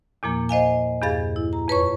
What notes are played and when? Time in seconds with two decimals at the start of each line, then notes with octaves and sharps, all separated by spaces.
0.23 E2 A#2 F3 A#3
0.49 C5 D#5 F5 G#5
1.02 E2 G2 G#4 F5 A6
1.36 E4
1.53 A#5
1.68 F2 B4 C#5 C#6